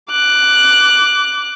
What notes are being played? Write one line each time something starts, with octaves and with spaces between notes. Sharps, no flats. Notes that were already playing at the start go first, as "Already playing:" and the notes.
D6 F#6